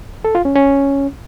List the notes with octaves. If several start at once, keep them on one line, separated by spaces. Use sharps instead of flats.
A4
F4
C#4
C#4